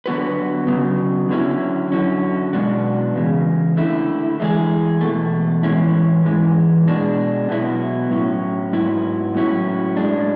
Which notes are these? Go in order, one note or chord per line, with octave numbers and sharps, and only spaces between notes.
D3 F#3 B3 F#4 B4
C#3 F#3 B3
D3 F#3 C#4 E4
F#2 D3 F#3 C#4
B2 G#3 B3 D4 F#4
E2 C#3 G#3
D3 A3 E4
E3 G#3 D4 G#4
E2 B2 A3
A2 E3 G#3 C#4 E4
G#2 E3 G#3
B2 G#3 D4
B2 F#3 B3 E4
A2 F#3 C#4
G#2 F#3 B3 E4
A2 F#3 C#4 E4
A2 G#3 D4